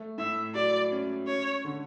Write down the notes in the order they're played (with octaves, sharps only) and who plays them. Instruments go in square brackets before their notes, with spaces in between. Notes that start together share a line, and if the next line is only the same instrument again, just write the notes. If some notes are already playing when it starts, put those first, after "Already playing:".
Already playing: [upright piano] A3
[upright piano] A2 [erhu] E5
[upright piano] F#3 [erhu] D5
[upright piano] C#4
[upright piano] C#4 [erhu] C#5
[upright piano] D3